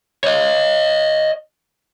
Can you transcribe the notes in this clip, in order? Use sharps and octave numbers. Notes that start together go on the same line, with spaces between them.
C#5 D#5